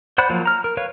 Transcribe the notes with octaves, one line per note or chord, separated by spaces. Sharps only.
C5 D5 F#5 B5 F#6
F3 F#3 A#3
A#5 F6
A#4
B4 C#5 F5